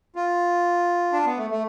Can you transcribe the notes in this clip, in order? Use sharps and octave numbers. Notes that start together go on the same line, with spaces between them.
F4
D4
B3
A3
A3